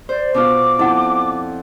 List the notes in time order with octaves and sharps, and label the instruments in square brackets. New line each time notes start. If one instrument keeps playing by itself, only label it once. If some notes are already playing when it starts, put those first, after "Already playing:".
[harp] C5 [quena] D5
[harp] B2 D4 F4 [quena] D6
[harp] F2 D4 [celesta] E4 F#5